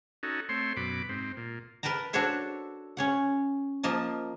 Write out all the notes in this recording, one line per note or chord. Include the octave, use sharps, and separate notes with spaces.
C#4 D#4 F#4 A4
A3 C4 C#5 C6
F#2 B2 B5 D6
G#2 C4
A#2
A#4 B4 G5 A5 A#5
D4 F#4 A4 C5 C#5 E5
C#4 C#5 F#5
F3 A#3 D#5 A5